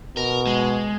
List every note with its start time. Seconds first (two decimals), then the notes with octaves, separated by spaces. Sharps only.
0.17 B2 A#4
0.47 G#3